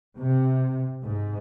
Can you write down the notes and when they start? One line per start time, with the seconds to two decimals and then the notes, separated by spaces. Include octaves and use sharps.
0.18 C3
1.04 G#2